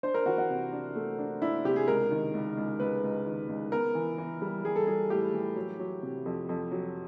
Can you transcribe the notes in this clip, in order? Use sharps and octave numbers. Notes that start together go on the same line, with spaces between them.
D4 C5
A#4
E3 F#4
F#4
C3
D4
A3
D4
D4 E4
C3 G4
G#4
C#2 A#4
D#3
C#2
C#2
C#2 B4
C#2
D#3
C#2
B3 A#4
E3
E3
G3
G3 G#4
A4
G3 G#4
A2 G4
E3
F#3
F#3
C3
F2
F2
F#3